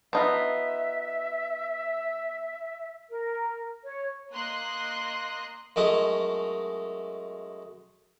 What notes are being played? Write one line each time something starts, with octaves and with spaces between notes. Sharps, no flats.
B3 D#4 F4 E5
A#4
C#5
A#3 D#5 C6 F#6
F#2 G#3 A3 D#4